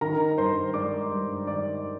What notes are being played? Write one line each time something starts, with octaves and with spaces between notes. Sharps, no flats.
D#3 A#4 A#5
G2 C5 C6
G#3 D5 D6
G2
D#3 D5 D6